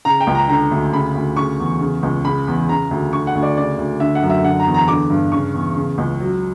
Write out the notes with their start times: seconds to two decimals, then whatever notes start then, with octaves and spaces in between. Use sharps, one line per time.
0.05 C#3 A#5
0.20 G5
0.27 C#2
0.35 A#5
0.49 D3 A#5
0.71 D2
0.93 C#3 B5
1.15 D2
1.37 C#3 C#6
1.60 E2
1.81 C#3
2.03 C#2
2.25 C#3 B5
2.47 E2
2.69 C#3 A#5
2.91 D2
3.12 D3 C#6
3.27 F#5
3.35 D2
3.43 D5
3.57 C#3 D5
3.79 D2
4.00 D3 E5
4.15 F#5
4.22 F#2
4.30 E5
4.44 D3 F#5
4.60 A#5
4.67 E2
4.74 A#5
4.88 D3 D6
5.10 G2
5.32 C#3 C#6
5.54 E2
5.76 C#3
5.98 C#2
6.20 F#3